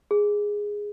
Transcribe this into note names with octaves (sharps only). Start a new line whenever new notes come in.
G#4